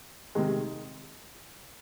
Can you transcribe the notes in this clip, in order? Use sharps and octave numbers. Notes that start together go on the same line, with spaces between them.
C3 D#3 G#3